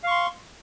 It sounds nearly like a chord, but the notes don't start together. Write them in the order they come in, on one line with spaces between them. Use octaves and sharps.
F5 C#6 C6